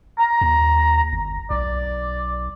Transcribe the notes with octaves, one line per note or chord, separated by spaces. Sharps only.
A#5
D#2
G1
B1 D5